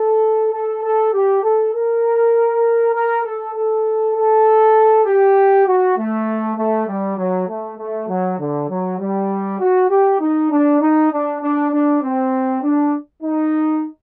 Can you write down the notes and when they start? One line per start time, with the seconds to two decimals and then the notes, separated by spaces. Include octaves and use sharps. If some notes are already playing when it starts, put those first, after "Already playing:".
Already playing: A4
0.52 A4
0.82 A4
1.13 G4
1.43 A4
1.73 A#4
2.94 A#4
3.24 A4
3.54 A4
4.15 A4
5.06 G4
5.66 F#4
5.96 A3
6.57 A3
6.87 G3
7.18 F#3
7.48 A3
7.78 A3
8.08 F#3
8.38 D3
8.69 F#3
8.99 G3
9.60 F#4
9.89 G4
10.20 D#4
10.50 D4
10.81 D#4
11.11 D4
11.41 D4
11.71 D4
12.02 C4
12.62 D4
13.23 D#4